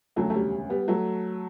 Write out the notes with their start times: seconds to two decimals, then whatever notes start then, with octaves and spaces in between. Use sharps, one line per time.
0.16 E1 D2 C#3 F#3 A3
0.30 A3
0.34 G3
0.70 G3 B3
0.88 F#3 A3